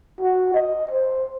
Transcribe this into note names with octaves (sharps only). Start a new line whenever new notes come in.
F#4
D#5
C5